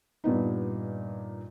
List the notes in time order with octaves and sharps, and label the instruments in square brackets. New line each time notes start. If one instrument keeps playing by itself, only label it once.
[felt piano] G2 A#2 B3 D#4